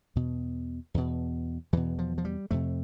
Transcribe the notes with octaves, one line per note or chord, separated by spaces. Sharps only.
E2 B2
E2 B2
E2 B2 E3
F3
F3
G3
F2 C3 A3